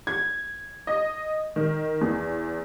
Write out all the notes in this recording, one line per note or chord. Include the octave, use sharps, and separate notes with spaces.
G#6
D#5
D#3
E2